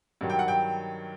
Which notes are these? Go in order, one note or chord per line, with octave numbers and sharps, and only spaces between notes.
G2 D#3 F#3
G5
F#5
G5